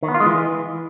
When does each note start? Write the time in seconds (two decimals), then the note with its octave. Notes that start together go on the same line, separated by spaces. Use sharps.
0.03 D#3
0.08 B3
0.14 F4
0.20 G#3
0.26 E3